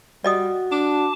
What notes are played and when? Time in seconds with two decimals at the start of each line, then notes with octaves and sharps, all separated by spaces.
0.24 G3 F#4 D5 D#5 D#6
0.72 D4 A5 D6